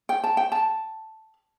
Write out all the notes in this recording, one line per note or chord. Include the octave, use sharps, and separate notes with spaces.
G5
A5
G5
A5